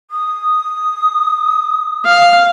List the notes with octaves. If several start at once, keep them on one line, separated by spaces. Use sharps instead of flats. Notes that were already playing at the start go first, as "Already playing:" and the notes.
D#6
F5